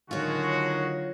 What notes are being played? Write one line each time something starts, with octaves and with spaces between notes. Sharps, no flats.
D3 D#3 F#3 G#3 F4 F#4 C#5